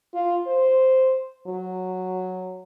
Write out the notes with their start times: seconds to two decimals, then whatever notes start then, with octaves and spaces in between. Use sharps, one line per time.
0.14 F4
0.47 C5
1.47 F#3